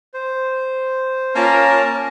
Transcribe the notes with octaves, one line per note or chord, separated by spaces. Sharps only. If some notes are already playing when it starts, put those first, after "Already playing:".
C5
A#3 C#4 F4 A#4 A5